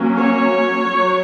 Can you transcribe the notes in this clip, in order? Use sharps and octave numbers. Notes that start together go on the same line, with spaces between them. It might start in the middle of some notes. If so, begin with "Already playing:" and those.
Already playing: F#3 A#3 C#4
C#5
F#3